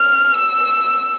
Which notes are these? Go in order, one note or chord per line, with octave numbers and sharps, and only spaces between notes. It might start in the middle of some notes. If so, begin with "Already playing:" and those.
Already playing: F6
E6